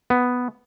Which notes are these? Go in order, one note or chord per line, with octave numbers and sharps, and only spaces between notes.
B3